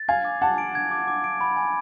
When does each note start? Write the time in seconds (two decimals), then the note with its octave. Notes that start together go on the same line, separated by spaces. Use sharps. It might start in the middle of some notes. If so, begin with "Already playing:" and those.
Already playing: A6
0.08 F5 G#5 G#6
0.25 D6
0.42 F#5 A5 D6
0.58 D7
0.75 G#6
0.91 D6
1.08 D6
1.24 D7
1.41 B5
1.57 G#5